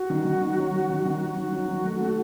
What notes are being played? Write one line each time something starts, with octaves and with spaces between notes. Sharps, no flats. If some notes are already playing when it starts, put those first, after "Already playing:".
Already playing: F#4
D#3
D#3
D#3
F#3
F#3
D#3
D#3
F#3 F#4
D#3
F#3
D#3
A3
A3